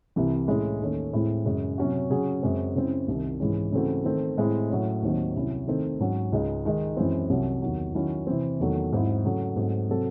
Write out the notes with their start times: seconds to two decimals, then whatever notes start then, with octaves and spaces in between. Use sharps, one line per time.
0.16 C2 C3 E3
0.48 A2 G#3 C#4 E4
0.80 D#2 D#3 A3 C#4
1.13 A2 G#3 C4 E4
1.45 F#2 C#3 G#3
1.78 C3 F#3 C#4 F#4
2.10 C#3 F#3 C#4 G#4
2.43 F#2 C#3 G#3 C4
2.75 C#3 G#3 C4 E4
3.08 C2 C3 D#3
3.40 G#2 E3 G#3 C#4
3.72 C#3 E3 A3 C4 F#4
4.04 D#3 A3 C4
4.37 A2 G#3 C4 E4
4.70 A2 F#3 C#4
5.02 D#2 D#3 F#3 C4 D#4
5.35 C2 C3 F#3 C#4 E4
5.68 D#3 A3 C4 D#4
5.99 G#2 F#3 C#4
6.32 C#2 C#3 G#3 D#4
6.65 D#3 G#3 D#4
6.97 F#2 E3 G#3 C4
7.30 C2 C3 F#3 C#4
7.62 E2 D#3 F#3
7.94 D#3 F#3 C#4 E4
8.27 C3 E3 C4
8.60 E2 D#3 F#3 A3
8.92 G#2 F#3 C4 E4
9.25 C#3 F#3 A3
9.56 G#2 F#3 A3 C4
9.89 C3 F#3 C4 F#4 A4